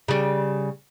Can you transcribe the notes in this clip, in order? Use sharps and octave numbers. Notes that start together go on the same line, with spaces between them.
C#3 G3